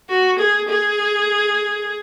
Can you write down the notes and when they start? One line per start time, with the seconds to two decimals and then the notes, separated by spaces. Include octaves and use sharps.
0.10 F#4
0.39 G#4
0.69 G#4